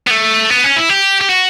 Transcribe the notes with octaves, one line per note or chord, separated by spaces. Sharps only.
B3
A3
B3
C#4
E4
G4
G4
F#4